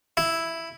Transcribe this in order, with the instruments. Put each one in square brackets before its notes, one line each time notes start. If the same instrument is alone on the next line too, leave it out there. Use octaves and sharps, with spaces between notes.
[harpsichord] E4